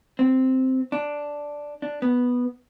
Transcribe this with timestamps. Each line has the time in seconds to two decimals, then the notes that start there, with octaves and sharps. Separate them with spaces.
0.19 C4
0.92 D4
1.82 D4
2.02 B3